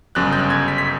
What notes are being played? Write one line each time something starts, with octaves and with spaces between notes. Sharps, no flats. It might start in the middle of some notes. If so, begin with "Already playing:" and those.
G1 F#2 C#3 F#6
G6
G#6
B6
B6